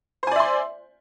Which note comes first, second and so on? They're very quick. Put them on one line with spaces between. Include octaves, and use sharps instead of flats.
C5 G#5 D5 E5 C6